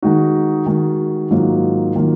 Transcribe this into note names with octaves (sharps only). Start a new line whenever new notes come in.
D#3 G#3 D#4 F#4
D#3 G#3 D#4 F#4
G#2 D#3 F#3 A#3 F4
D#3 F#3 A#3 F4